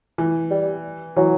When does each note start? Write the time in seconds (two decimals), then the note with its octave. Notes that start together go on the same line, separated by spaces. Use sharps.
0.18 E3
0.51 G3
1.16 E3 F#3